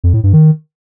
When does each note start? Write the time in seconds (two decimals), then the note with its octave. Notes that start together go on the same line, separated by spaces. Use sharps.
0.04 F2
0.14 A2
0.23 G2
0.33 D#3